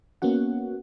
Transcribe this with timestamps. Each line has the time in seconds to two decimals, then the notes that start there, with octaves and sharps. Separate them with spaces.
0.22 A#3 B3 C#4 F#4 F#5